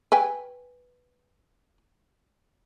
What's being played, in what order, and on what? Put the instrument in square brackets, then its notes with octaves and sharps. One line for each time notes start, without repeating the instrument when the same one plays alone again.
[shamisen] B4 G5 G#5